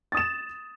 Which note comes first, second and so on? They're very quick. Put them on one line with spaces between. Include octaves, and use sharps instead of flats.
A6 D#6 E7